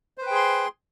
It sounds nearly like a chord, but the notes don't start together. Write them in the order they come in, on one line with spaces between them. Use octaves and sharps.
C5 B4 G5 G#4 C6